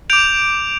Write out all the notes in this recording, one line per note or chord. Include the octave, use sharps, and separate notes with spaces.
D6 G6 D7 F7